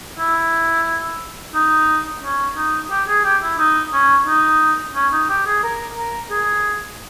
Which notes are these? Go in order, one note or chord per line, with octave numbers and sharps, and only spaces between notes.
E4
D#4
C#4
D#4
G4
G#4
G4
E4
D#4
C#4
D#4
C#4
D#4
G4
G#4
A#4
A#4
G#4